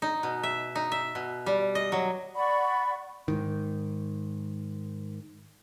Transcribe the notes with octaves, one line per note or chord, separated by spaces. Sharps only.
D#4
B2
E5
D#4
E5
B2
G3
D#5
F#3
D5 F#5 B5 C#6
G#2 D#3